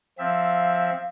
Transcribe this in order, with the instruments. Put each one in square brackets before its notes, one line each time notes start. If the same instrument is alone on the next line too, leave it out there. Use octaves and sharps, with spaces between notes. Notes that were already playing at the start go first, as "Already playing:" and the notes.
[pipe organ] F3 C4 E5 [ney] F5